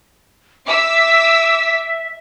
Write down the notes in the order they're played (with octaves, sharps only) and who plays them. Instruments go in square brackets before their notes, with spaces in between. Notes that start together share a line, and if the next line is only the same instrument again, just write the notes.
[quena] E5 [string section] D6 E6 B6